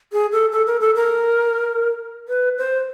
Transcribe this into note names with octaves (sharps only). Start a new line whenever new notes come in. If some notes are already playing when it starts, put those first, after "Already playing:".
G#4
A4
A4
A#4
A4
A#4
B4
C5